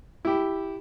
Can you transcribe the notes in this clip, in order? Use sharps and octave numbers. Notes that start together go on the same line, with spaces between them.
E4 G4